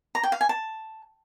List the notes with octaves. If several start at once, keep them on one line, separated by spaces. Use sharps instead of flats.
A#5
G5
F5
G#5
A5